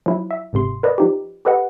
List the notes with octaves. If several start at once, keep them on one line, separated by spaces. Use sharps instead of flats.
F3 F#3 E4
E5
G1 G#2 C3 C6
A#4 B4 D5 D#5
F3 D#4 G4
G4 A4 B4 D#5 F#5